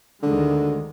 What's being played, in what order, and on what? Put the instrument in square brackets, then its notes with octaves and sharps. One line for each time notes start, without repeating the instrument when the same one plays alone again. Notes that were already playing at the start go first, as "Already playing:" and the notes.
[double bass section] D2 D#3 G#3 [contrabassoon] D3